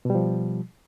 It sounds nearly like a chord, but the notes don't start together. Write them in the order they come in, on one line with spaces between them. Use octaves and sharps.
B2 G3 F3